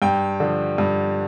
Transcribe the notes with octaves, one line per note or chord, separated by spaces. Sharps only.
G2 G5
D3 F3
G2